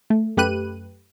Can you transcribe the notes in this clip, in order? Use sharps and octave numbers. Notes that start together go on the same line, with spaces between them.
A3
F#2 A3 G4 B4 F#6 D#7